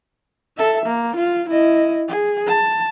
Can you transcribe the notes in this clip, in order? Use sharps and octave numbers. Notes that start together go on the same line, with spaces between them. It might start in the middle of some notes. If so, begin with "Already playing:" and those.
A4 E5
A#3
F4
E4 D#5
G#4
A5